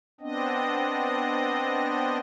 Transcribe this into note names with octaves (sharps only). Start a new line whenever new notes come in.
B3 C4 D4 D#5